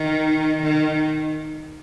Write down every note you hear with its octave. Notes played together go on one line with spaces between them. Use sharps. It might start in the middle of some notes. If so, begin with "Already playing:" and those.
Already playing: D#3
D#3